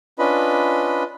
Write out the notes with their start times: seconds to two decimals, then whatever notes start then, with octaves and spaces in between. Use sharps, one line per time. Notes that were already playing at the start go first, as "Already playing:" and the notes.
0.19 C#4 D4 F4 B4 D#5 B5